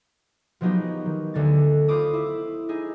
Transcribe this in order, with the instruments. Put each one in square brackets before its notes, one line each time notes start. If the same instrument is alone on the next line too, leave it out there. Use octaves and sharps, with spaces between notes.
[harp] F3 F#3 G#3 B3 D#4 G4
D#3
D2 D3 G#3 A6
F4 C5 B5 D6 D#6
E4
D#4 E4 G#4